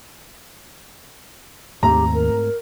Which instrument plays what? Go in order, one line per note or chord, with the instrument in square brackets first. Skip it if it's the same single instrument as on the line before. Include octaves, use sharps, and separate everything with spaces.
[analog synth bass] D#2 [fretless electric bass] G#2 A3 C4 [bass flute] G4 [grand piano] A#5
[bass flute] A#4